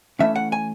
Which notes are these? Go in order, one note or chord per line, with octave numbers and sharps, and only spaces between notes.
E3 A3 C#4 E5
F#5
G#5